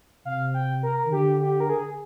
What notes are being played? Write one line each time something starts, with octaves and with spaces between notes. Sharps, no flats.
C3 F5
G5
A#4
D#3
D3 G4
G4
A#4
G#4